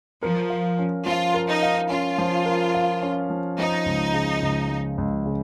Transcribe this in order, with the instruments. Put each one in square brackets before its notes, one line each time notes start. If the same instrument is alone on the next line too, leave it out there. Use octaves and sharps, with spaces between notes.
[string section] F3 [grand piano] A#4
[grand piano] F5
C#4
[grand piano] F3 [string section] F4
[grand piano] A#4
[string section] D#4
[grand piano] F5
[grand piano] C#4 [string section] F4
[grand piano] F3
A#4
F5
C#4
F3
[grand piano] F3 [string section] D#4
[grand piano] C#2
C#3
C#2
F3
C#2
C#3